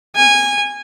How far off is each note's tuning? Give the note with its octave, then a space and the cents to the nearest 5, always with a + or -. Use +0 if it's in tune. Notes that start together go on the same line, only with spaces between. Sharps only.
G#5 -20